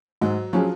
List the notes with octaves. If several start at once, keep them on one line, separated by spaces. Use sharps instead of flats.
G#2 F#3 F#4
F3 F#3 C#4 F4 G#4